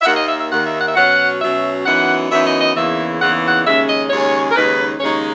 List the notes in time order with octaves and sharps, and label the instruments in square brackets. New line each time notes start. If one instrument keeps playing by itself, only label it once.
[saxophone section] E5
D#2 D#3 A#3 F#5
D#5
E5
E5
D#2 D#3 A#3 F#5
E5
F#5
E5
B2 F#3 C#4 F#5
B2 F#3 C#4 E5
F#2 E3 B3 D#4 F#5
F#2 E3 B3 D#4 E5
D#5
D#5
E2 C#3 E3 A#3 D#4 E5
E2 C#3 E3 A#3 D#4 F#5
F#5
D#2 C#3 G#3 C#4 E5
D#5
D#2 C#3 G#3 C#4 C#5
A#4
D#2 C#3 G#3 D#4 B4
D#2 C#3 G#3 D#4 C#5